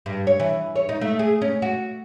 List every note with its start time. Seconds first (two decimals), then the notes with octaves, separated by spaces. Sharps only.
0.06 G2
0.27 C#5
0.40 E3
0.76 C#5
0.89 D#4
1.01 A3
1.19 G#4
1.42 C#4
1.62 F#4